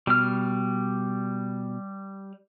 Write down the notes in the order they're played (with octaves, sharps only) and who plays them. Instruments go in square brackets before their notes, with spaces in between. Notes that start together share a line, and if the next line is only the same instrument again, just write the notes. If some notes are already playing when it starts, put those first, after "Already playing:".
[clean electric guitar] B2 [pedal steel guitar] G3 F6